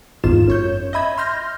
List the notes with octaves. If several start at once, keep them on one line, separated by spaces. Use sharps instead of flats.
G#1 E2 G#2 F4 E7
F#2 C#5 G6
D#5 E5 B5 G#6
C6 F6 G6 A#6